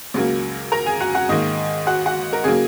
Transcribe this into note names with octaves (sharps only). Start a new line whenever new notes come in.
C#2 C#3 F#3 A#3
A#4 A#5
G#4 G#5
F#4 F#5
F#4 F#5
G#2 D#3 A#3 D#4 D#5
F#4 F#5
F#4 F#5
A#4
C#3 F#3 A#3 G#4